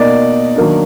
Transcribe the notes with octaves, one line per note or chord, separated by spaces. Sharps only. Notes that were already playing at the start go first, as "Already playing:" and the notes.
Already playing: B2 A#3 D#4 D5
D#3 F#3 A#3 D4